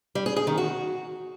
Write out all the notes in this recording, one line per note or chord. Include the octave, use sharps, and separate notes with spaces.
G3
G#4
G#4
D#3
F#4